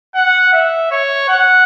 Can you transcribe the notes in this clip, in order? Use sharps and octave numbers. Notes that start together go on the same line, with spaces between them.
F#5
E5
C#5
F#5